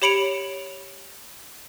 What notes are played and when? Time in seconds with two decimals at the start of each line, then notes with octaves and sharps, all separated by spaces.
0.02 G4 C#5 B5 C#7 D7 F7